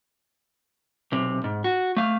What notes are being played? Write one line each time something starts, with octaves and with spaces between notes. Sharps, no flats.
B1 C3
G#2
F#4
A3 F5